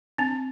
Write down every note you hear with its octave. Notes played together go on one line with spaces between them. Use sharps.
C4 D4